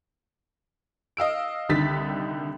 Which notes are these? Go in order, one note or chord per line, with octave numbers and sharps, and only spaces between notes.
D#5 F5 E6 D7
C2 D3 D#3 D#4 A6 B6